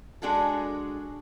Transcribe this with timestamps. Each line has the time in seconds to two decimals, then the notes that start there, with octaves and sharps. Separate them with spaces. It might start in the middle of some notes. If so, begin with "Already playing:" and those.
0.22 G#3 D4 F#4 G#4 A4